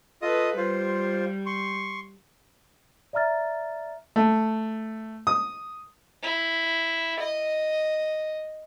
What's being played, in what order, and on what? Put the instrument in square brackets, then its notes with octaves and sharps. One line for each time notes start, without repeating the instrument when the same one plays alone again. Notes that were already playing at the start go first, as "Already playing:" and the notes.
[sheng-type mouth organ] F4 D#5 D#6 [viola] A4 B4
[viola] G3 [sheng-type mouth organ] F4 C5
[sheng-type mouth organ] C6 C#6
[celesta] D5 E5 A#5 F6 A6
[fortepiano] A3
D#6
[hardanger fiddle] E4
D#5